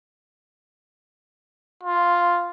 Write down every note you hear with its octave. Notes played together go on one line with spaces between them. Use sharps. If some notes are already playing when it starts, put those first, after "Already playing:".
F4